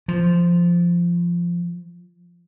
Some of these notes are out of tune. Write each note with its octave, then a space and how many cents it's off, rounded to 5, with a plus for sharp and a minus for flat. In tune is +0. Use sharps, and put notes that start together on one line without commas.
F3 -10